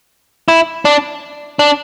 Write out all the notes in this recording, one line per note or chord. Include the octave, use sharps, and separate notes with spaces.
E4
D4
D4